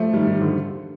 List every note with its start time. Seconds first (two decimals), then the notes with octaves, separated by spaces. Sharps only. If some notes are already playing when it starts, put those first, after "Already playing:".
Already playing: F3 A3
0.13 D#3 G3
0.27 D#3 G3
0.41 D3 F3